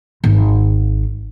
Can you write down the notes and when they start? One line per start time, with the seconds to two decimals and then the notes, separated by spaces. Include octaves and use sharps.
0.24 G#1